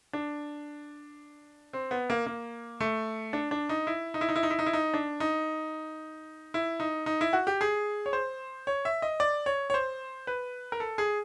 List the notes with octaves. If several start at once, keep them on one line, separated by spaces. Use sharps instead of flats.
D4
C4
B3
A#3
A#3
A3
D4
D4
D#4
E4
D#4
E4
D#4
E4
D#4
E4
D#4
E4
D#4
D4
D#4
E4
D#4
D#4
E4
F#4
G4
G#4
C#5
C5
C#5
E5
D#5
D5
C#5
C#5
C5
B4
A#4
A4
G#4